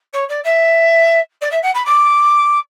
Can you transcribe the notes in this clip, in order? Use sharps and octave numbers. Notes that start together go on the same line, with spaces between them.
C#5
D5
E5
D5
E5
F#5
B5
D6